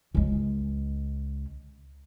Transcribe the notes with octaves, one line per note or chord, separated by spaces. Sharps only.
C#2 G#3